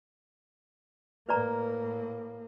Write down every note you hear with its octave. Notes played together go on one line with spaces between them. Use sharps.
A2 A#3 B4 D5 A#5